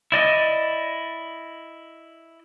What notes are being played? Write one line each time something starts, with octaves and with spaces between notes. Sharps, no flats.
E4 D5 D#5